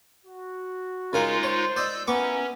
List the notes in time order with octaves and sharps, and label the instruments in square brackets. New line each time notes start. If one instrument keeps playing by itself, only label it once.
[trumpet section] F#4
[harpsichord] C#3 A#4 G#5 [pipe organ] G#3 D#4 F4
[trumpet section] C5 [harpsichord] C#5
[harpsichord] D5 D#5 [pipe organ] E6 G6
[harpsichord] B3 C#6 D6 [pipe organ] C#4 [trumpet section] E4 F4 A#4